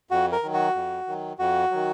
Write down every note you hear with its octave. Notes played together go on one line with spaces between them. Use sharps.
F2 F#4
A#4
D#3 F#3
F#4
F2
D#3 F#3
F2 F#4
D#3 F#3